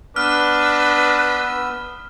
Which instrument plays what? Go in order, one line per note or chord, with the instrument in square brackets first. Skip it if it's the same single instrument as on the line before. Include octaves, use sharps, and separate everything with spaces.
[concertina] B3 E6 [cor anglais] D4 [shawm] B4 [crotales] F6